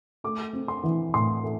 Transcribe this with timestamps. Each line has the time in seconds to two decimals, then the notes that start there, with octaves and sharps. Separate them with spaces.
0.24 A3 D6
0.53 C4
0.68 C6
0.83 E3
1.14 A2 C6
1.44 A3